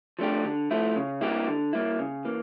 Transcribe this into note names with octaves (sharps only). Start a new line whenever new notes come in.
F3 A3 D4 G4
D3
F3 A3 E4
C#3
G3 A#3 E4 G4
D3
G3 A#3 E4
C#3
E3 A#3